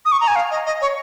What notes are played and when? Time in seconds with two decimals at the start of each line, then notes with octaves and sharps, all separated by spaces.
0.05 D#6
0.12 C#6
0.21 A#5
0.28 G#5
0.36 F5
0.51 D#5
0.66 D#5
0.81 C#5